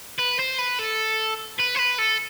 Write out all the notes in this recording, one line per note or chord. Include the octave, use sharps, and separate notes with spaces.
B4
C5
B4
A4
B4
C5
B4
A4